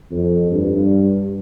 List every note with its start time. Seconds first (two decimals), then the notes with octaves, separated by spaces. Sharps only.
0.11 F2
0.52 G2